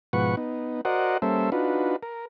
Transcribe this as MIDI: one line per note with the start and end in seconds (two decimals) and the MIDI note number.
0.13 0.36 44
0.13 0.36 47
0.13 0.36 53
0.13 0.36 71
0.13 0.36 78
0.13 0.36 85
0.37 0.81 59
0.37 0.81 63
0.85 1.17 66
0.85 1.17 70
0.85 1.17 72
0.85 1.17 74
0.85 1.17 75
0.85 1.17 78
1.22 1.50 55
1.22 1.50 58
1.22 1.50 61
1.22 1.50 69
1.22 1.50 72
1.22 1.50 76
1.52 1.96 62
1.52 1.96 63
1.52 1.96 65
1.52 1.96 66
1.52 1.96 71
2.03 2.25 70